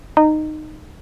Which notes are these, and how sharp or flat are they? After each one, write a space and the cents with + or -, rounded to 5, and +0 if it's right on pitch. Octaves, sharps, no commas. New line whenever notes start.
D#4 -15